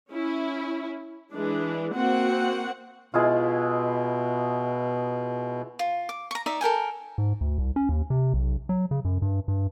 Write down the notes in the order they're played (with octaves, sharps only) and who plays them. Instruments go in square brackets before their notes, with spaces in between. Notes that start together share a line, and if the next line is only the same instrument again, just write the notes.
[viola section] C#4 E4
E3 G#3 D4
A#3 C4 F#4 F#5
[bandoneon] B2 [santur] G#3 E4 F4
[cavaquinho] F4
D6
A#5 C#6
D#4 D5 E5
A4 A#4 G5 G#5
[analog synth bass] G#2
D2
C2
C#4
D#2
C3
B1
F#3
C#3
F#2
G2
G2